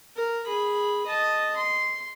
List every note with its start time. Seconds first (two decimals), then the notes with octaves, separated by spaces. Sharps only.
0.16 A#4
0.45 G#4 B5
1.06 D#5 A5
1.56 C6